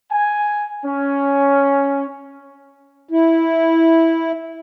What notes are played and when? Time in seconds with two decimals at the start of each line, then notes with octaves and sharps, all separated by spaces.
0.11 G#5
0.85 C#4
3.09 E4